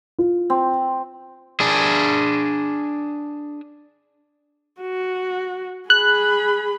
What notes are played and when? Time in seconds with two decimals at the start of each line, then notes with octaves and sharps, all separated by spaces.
0.19 F4
0.50 C4
1.60 D4 G#4
4.81 F#4
5.90 G#4 B5 F#6